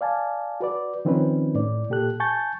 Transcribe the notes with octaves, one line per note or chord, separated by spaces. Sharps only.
D5 F5 G#5 A5
F#4 B4 D5
D#3 F3 C4 C#4 D#4 B4
A2 D5
A#2 G4 A4 F#6
G#5 A5 C#6 G6 A6